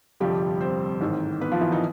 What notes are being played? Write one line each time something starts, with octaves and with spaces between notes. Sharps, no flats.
G1 F2 C3 F3 G3 G4
C4 C5
A1 G#2 D#3
B3 B4
F3 F4
E3 E4
D#3 D#4